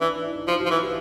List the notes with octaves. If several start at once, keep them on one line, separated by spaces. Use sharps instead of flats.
E3 D4
D#4
E4
D#4
F3 F4
F#4
F3
E3 F#4
G4